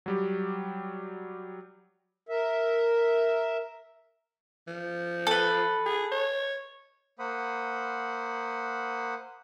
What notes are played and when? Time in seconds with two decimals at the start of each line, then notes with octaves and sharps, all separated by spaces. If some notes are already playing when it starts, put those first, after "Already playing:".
0.06 F#3 G3 G4
2.29 A#4 E5
4.67 F3
5.27 A4 B4
5.86 G#4
6.12 C#5
7.19 A#3 C5 F#5 B5 D#6